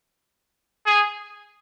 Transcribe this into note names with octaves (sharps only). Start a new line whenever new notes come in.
G#4